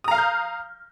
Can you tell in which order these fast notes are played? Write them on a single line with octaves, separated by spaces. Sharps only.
D#6 A#5 F5 F6 G6